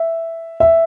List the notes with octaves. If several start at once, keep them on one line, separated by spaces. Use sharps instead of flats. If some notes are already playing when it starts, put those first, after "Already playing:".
Already playing: E5
E5